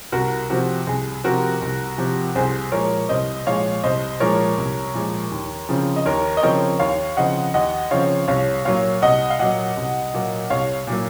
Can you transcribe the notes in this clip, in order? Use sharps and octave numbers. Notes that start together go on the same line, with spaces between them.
C2 F#4 A#4
C3 F3 C4 F#4
C2 G#4
C3 F3 C4 F#4 A#4
C2
C3 F3 C4
C2 G#4 C5
A#2 F3 G#3 A#4 C#5
C2 C5 D#5
A#2 F3 G#3 C#5 F5
C2 C5 D#5
A#2 F3 G#3 A#4 C#5
C2
A#2 F3 G#3
D#2
C#3 F3 C4
D#5
D#2 A#4 C#5
D#5
C#3 F3 C4 A#4 C#5
D#2 C#5 F5
C#3 F3 C4 D#5 F#5
D#2 D#5 F#5
C#3 F3 C4 C#5 F5
C2 C#5 F5
A#2 F#3 A#3 C#5 F5
C2 D#5 F#5
F5
A#2 F#3 A#3 D#5 F#5
C2
A#2 F#3 A#3
C2 C#5 F5
A#2 F#3 A#3